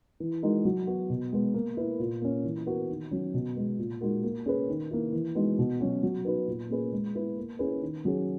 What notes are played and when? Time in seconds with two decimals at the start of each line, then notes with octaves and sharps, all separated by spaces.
0.20 E3
0.43 G#3 D#4 F#4 A#4
0.65 F#3
0.87 B3 F#4
1.10 B2
1.32 G#3 B3
1.54 A#3
1.77 E4 B4
1.99 A#2
2.22 A#3 C#4
2.44 E3
2.66 B3 F#4 A#4
2.89 D#3
3.11 F#3 C#4
3.34 B2
3.57 G#3 B3
3.79 A#2
4.01 G#3 D#4 F#4 A#4
4.24 A#3
4.46 C#4 G#4 B4
4.69 D#3
4.91 A#3 E4
5.13 E3
5.35 G#3 B3 D#4 F#4
5.58 B2
5.80 F#3 C#4 F#4
6.03 F#3
6.25 B3 D#4 F#4 B4
6.47 A#2
6.70 A#3 C#4 G#4 B4
6.92 G#3
7.14 B3 E4 B4
7.37 A#3
7.59 C#4 E4 G#4 B4
7.82 D#3
8.05 F#3 C#4 G#4